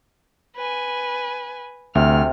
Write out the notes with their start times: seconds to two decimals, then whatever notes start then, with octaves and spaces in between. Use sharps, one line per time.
0.56 B4 G#5
1.95 D2 C3 F6